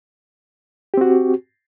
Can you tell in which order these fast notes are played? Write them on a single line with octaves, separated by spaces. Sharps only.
G4 C4 F#4